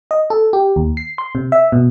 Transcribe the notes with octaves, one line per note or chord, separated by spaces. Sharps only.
D#5
A4
G4
D#2
C7
C6
C3
E5
B2